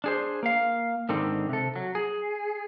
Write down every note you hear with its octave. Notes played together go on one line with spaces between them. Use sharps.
D4 G#4 C5
A#3 F5
G#2 D3 D#3 C4
C3 A4
F#3
G#4